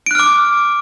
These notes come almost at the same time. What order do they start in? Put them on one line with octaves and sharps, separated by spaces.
D7 F#6 F6 D6